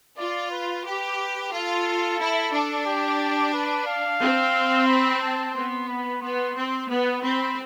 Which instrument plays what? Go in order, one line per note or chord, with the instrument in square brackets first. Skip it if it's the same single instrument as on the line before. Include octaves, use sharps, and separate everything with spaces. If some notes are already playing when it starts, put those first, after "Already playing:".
[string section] F4 [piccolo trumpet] D5
[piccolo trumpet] B4
[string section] G4 [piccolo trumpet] B4
[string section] F4 [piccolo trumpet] A4
[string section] E4
D4
[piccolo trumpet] G4
B4
F5
[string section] C4
[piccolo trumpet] B5
A5
[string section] B3 [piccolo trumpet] C6
[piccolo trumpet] B5
[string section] B3 [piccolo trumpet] C6
[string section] C4
[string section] B3 [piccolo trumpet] B5
[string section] C4 [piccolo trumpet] B5